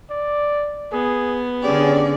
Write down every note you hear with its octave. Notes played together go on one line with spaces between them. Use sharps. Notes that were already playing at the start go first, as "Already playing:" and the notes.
D5
B3 G#4
D3 C#4 G4 G#4 D5